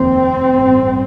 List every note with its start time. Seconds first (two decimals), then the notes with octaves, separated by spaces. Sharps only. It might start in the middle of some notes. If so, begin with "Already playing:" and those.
Already playing: F1 D#2 C4
0.53 A1 G2